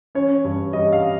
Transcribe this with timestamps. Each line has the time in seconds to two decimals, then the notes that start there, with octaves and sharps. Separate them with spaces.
0.15 C#4 C#5
0.44 G2
0.73 G3 D#5
0.92 F5